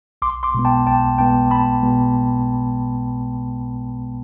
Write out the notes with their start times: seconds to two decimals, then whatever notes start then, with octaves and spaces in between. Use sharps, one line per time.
0.22 B1 C6 D6
0.43 C6 D6
0.54 B2 G#3 B3
0.65 G5 A5
0.87 B1 G5 A5
1.18 B2 G#3 B3 G5 A5
1.50 B1 A5 B5
1.83 B2 G#3 B3